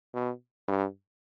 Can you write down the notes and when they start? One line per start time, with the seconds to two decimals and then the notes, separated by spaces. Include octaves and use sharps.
0.14 B2
0.68 G2